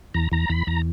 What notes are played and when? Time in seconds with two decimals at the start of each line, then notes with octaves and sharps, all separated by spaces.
0.14 E2 A#5
0.32 E2 A#5
0.49 E2 B5
0.67 E2 A#5